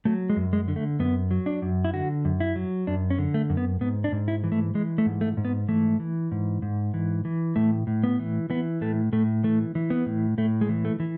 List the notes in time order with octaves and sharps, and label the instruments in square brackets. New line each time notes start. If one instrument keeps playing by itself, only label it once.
[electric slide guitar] F#3 A3
G#3
F#2
G#3
D3
A3
F#2 B3
F#3
D4
F#2
E4
D3 F#4
F#2
E4
F#3
F#2 D4
C#4
D3
A3
F#2
B3
G#2 B3
D4
G#2
E4
E3
A3
E3 G#3
A3
G#2
A3
G#2
B3
E3 A3
E3
G#2
G#2
E3
E3
A2 A3
A2
B3
E3
E3 B3
A2 A3
A2 A3
E3 A3
E3
B3
A2
A2 A3
G#3
E3
A3
E3